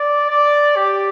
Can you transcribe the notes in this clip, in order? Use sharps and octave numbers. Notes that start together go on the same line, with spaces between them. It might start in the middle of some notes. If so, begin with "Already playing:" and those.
Already playing: D5
D5
G4